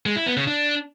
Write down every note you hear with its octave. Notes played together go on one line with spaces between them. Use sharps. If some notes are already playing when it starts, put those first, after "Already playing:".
G#3
E4
B3
C#3
D4